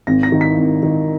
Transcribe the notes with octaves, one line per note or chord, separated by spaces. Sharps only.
G#1 A#6
A#6
D#3
B6
G#1
D#3